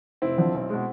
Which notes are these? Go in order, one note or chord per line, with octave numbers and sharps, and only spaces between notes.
F1 C4 E4
F2 D3 F3
B1
B2 G#3